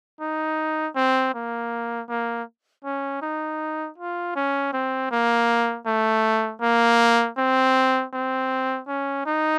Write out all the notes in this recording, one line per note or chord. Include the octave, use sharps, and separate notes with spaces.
D#4
C4
A#3
A#3
C#4
D#4
F4
C#4
C4
A#3
A3
A#3
C4
C4
C#4
D#4